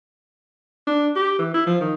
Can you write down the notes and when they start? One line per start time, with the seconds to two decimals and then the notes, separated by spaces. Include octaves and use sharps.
0.87 D4
1.16 G4
1.39 E3
1.54 E4
1.67 F3
1.80 D#3